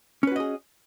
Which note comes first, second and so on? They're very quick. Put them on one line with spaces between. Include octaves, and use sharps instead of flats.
C#4 B4 F#4 D#5 G#4